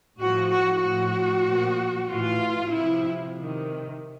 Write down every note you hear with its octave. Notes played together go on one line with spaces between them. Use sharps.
A2 F3 F#4
F#4
A2 F3 F#4
A#2 F3
A2 E3 F4
C3 F3 E4
C3 D#3